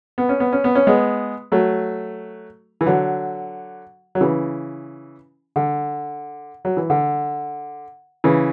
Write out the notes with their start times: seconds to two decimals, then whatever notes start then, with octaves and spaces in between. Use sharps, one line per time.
0.18 B3
0.29 C#4
0.40 B3
0.53 C#4
0.64 B3
0.75 C#4
0.87 G#3 B3
1.52 F#3 A3
2.81 E3
2.86 D3 F#3
4.15 F#3
4.21 C#3 E3
5.56 D3
6.65 F#3
6.77 E3
6.90 D3
8.24 C#3 E3